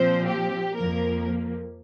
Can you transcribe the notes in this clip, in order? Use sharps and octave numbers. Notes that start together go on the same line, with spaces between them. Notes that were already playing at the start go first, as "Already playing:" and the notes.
Already playing: A#2 F3 C4 C5
G4
F2 F3 A#3 A#4